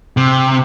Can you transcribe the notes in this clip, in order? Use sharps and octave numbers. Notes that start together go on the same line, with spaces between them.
C3